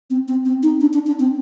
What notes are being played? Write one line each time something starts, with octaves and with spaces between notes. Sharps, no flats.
C4
C4
C4
D#4
D4
D4
D4
C4